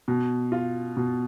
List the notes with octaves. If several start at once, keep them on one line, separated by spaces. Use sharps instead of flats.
B2
F4
B2